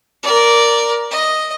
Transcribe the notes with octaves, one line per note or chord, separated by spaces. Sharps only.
A#4 D5
D#5